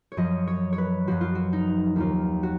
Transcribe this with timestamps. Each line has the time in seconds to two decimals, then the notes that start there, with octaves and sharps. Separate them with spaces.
0.12 C#5
0.17 F#2 F3 D#5
0.47 C#5
0.73 C#5
0.78 B4
1.07 F#2 F3 F#4
1.21 F4
1.35 F#4
1.53 D#4
1.96 D#2 D#3 F4
2.43 F#4